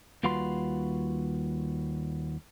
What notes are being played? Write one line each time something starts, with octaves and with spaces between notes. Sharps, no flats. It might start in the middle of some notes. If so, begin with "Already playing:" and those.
D#2 G3 F4 F#4 B4 C6